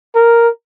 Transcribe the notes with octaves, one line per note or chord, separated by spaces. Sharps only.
A#4